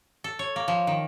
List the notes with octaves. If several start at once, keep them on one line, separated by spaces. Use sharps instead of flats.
A4
C#5
A#3
F3
D#3